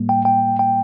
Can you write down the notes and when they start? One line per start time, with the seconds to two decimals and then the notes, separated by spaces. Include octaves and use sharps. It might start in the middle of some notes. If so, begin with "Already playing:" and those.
Already playing: A2 G3 A#3
0.09 G5
0.25 G5
0.59 G5